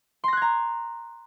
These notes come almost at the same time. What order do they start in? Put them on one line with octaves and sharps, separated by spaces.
C6 A#6 F#6 G#6 A#5